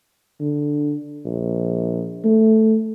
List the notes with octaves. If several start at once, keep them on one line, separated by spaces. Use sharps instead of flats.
D3
A#1
A3